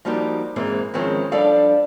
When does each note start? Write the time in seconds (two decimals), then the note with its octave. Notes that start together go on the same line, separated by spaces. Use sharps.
0.05 F3 G3 A#3 D#4 F#4 G4
0.56 G#2 E3 G#3 A#3 C4
0.94 D#3 F3 G#3 C4 C#4 E4
1.32 F3 G3 D4 A4 D5 F5